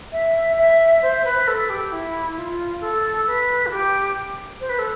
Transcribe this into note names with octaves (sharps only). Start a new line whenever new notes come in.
E5
E5
C5
B4
A4
G4
E4
F4
A4
B4
F4
G4
C5
B4
A4